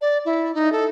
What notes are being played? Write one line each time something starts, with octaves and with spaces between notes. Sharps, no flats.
D5
E4
D#4
A4